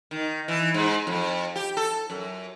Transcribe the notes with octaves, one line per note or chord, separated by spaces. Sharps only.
D#3
E3
G#2
F2
G4
A4
F#2